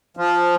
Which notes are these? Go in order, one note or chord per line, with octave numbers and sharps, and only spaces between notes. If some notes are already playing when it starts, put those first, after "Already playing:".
F3